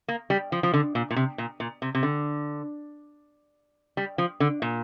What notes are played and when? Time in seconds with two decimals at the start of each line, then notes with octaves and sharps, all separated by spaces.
0.08 A#3
0.30 G3
0.52 F3
0.63 F3
0.74 D3
0.95 A#2
1.11 A#2
1.16 C3
1.38 A#2
1.60 A#2
1.82 C3
1.95 C3
2.03 D3
3.97 G3
4.18 F3
4.40 D3
4.62 A#2